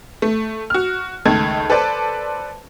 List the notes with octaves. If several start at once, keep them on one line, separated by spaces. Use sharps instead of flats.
A3
F#4 F6
C#2 D#3 A3 A5 G#6
A4 B4 C5 D5 A5